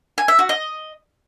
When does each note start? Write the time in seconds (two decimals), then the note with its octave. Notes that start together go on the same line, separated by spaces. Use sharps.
0.18 G#5
0.28 E5
0.39 F#4
0.49 D#5